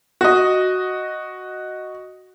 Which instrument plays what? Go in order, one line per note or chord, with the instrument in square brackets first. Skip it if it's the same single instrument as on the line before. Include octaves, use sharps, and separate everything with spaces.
[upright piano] F#4 D#5